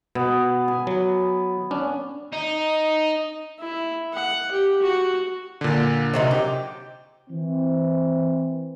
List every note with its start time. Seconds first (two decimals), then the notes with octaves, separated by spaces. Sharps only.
0.15 B2 B3
0.68 G#5
0.87 F#3
1.71 C#4 D4
2.33 D#4
3.60 E4
4.14 F#5
4.52 G4
4.82 F#4
5.61 A#2 D3
6.14 C3 F#3 D#4
6.31 G4
7.30 E3 C4